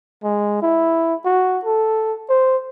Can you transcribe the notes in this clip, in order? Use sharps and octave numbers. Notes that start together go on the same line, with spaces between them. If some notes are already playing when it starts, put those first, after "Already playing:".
G#3
E4
F#4
A4
C5